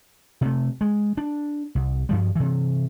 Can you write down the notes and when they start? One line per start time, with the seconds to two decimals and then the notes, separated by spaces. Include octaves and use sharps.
0.41 C3 A3
0.81 G#3
1.17 D4
1.75 C2
2.09 G2 F3 G3
2.36 C3 E3